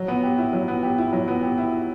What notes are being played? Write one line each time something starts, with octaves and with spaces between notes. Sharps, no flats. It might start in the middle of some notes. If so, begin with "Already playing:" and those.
Already playing: F#3
B3
G4
E4
F#3
B3
G4
E4
F#3
B3
G4
E4